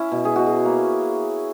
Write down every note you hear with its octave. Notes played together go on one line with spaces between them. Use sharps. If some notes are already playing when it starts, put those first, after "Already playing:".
Already playing: C#4 E4
B2
G#4
B2 F#4
G#4
A#3